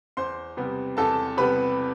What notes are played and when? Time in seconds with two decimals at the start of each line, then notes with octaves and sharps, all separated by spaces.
0.17 E2 C5 C6
0.57 C3 G3 B3
0.97 E2 A4 A5
1.37 C3 G3 B3 B4 B5